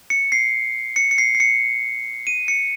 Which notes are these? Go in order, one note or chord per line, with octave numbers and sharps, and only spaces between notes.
C#7
C7
C#7
C#7
C7
C7
C#7
D#7
C#7